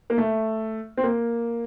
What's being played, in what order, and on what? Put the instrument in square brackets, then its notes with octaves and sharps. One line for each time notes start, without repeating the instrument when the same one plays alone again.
[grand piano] A#3
A3
C4
A#3